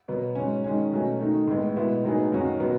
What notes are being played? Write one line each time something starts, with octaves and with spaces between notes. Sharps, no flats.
B2 F#3 B3
G#2 F#3 C#4
D#3 G#3 C#4
B2 F#3 A3 C#4
D#3 A3 D#4
A2 G#3 B3
B2 G#3 B3 E4
A2 F#3 B3 D#4 G#4
F#2 D#3 F#3 C#4 F#4
B2 F#3 B3